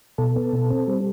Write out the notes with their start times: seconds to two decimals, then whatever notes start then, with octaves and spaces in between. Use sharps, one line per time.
0.18 B2 A4
0.36 B3
0.53 B2
0.70 C4
0.87 G3